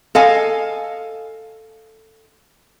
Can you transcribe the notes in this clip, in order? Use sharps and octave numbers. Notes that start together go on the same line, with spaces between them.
A4 D#5 F5 G#5